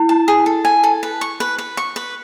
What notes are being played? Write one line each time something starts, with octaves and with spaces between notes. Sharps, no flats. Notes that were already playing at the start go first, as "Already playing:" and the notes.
Already playing: E4
A5
G#4
A4
G#5
A4
B4
C#6
B4
B4
C#6
B4